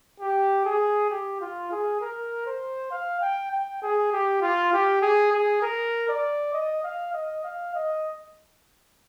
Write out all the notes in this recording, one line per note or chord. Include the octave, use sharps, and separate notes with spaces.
G4
G#4
G4
F4
G#4
A#4
C5
F5
G5
G5
G#4
G4
F4
G4
G#4
G#4
A#4
D5
D#5
F5
D#5
F5
D#5